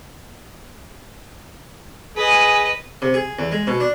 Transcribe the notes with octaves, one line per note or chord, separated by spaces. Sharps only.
G#4 B4 D#5
C3
G#4
E2
G#3
B2
D4